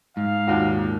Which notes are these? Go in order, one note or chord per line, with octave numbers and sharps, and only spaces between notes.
G#2 F5
D#2 A#2 F#4